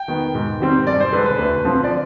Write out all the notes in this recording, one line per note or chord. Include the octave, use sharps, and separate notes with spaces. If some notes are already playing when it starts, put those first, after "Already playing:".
Already playing: G5
D#3 B3
G#2
D#3 G3 C4
G2 D5
C5
D3 G#3 B4
B4
D2
D3 F3 C4
D5